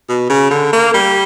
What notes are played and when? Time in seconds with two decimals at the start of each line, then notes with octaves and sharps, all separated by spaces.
0.09 B2
0.29 C#3
0.51 D3
0.72 A#3
0.94 G3